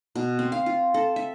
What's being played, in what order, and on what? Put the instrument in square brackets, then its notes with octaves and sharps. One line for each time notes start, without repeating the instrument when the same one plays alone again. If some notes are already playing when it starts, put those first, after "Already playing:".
[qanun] B2
C4
F5
F4
A4
E5